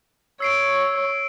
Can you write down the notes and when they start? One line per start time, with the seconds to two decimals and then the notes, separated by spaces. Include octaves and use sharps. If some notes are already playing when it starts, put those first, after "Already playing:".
0.40 C#5 E6 C7 D7